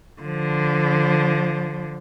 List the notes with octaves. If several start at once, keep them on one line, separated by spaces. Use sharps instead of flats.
D3 F3